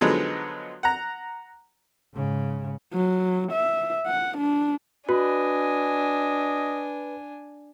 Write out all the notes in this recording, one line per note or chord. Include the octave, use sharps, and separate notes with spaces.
D3 F3 F#3 G#3 B3 D#4
F#5 A#5
G#2 C#3
F#3
E5
F#5
D4
D4 F#4 B4 D#5 G#5